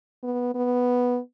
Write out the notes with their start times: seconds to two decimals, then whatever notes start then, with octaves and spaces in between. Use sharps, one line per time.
0.23 B3
0.55 B3